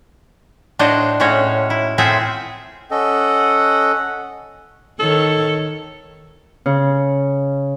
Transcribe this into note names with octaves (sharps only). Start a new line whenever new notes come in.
A2 D4 F#4 C5 C#5 D#5
A2 G#3 C#4 F#4 C#5
E4
A2 C4 F4 G#4 E5 F#5
C#4 A4 D#5 F#5
D#3 A4 C#5
C#3